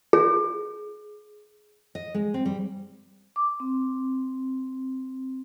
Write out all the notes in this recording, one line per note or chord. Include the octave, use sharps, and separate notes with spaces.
G#4
D#5
G#3
C4
G3
D6
C4